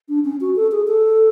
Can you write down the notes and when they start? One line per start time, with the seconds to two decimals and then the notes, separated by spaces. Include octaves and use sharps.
0.09 D4
0.25 C#4
0.41 F#4
0.56 A4
0.71 G#4
0.87 A4